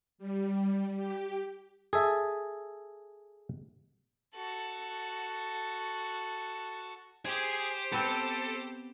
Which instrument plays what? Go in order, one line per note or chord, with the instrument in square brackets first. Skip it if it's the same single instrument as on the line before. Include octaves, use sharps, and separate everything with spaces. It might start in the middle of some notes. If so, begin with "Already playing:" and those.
[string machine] G3
G4
[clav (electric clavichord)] G#4 A4 E5
[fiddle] F#4 A4
[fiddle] G4 C5 [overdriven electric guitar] G#4 G#5
[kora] B3 C4 [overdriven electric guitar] A4